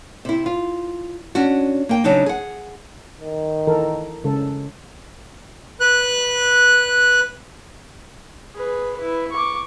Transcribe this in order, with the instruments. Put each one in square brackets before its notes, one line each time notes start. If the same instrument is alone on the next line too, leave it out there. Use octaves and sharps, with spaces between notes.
[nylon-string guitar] C3 E4
F4
C#4 D4 F#4
A#3 G5
C#3 F#3 D4 D#4
G#4 F#5
[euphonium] D#3
[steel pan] E3 A4 A#4
C#3 G#3 A4
[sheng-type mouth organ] B4 F#6
[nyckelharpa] G#4 B4
E4 B4
C#6 D6